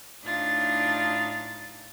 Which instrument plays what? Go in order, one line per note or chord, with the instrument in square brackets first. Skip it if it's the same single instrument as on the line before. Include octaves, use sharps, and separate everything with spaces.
[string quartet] A2 D4 D#4 F4 A6